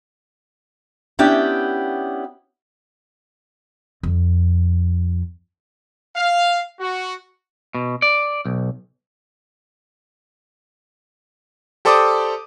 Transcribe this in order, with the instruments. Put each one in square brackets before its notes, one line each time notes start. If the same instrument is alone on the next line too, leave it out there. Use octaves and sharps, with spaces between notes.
[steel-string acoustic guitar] B3 C#4 D4 E4 G4 G5
[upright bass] F2
[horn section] F5
F#4
[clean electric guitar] B2
D5
B1
[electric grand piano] G4 A4 C5 D5 D6 D#6